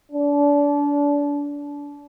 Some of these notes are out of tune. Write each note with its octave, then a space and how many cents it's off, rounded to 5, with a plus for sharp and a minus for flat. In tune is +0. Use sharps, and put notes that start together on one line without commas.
D4 -30